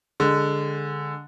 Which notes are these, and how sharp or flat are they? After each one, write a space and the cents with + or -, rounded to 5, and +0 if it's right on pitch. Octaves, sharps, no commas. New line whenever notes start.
D3 -5 G#3 -15